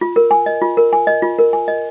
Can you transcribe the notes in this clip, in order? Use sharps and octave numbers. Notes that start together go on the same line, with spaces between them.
F4
A#4
G#5
D#5
F4
A#4
G#5
D#5
F4
A#4
G#5
D#5